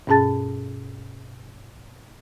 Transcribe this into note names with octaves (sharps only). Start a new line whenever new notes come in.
G2 B2 C#4 G#4 A5 A6